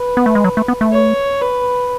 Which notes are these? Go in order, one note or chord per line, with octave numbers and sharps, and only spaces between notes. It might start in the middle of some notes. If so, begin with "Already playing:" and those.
Already playing: B4
B3
A3
G#3
F#3
A3
B3
A3
C#5
B4